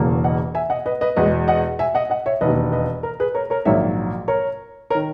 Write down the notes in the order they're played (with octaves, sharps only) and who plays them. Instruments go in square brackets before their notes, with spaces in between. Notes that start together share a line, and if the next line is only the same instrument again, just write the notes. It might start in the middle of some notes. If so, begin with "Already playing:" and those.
Already playing: [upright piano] E1 E2 C#3 E3 A#3
D#5 F#5
E5 G#5
D#5 F#5
B4 D#5
B4 D#5
E2 B2 G#3 B4 D#5
D#5 F#5
E5 G#5
D#5 F#5
D#5 F#5
C#5 E5
E1 D#2 D#3 B4 D#5
B4 D#5
A#4
G#4 B4
A#4 C#5
A#4 C#5
A#1 G#2 D#3 F#3 A#3 C#5 E5
A#4 C#5
A#4 C#5
D#3